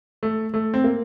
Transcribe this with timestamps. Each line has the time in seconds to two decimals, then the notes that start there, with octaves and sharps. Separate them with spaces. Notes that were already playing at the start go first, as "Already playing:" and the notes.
0.23 A3
0.54 A3
0.74 C4
0.84 A#3